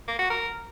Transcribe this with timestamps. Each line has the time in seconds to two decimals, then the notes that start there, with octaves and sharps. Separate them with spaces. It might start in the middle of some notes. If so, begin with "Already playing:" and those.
0.08 A#3
0.19 F#4
0.30 A#4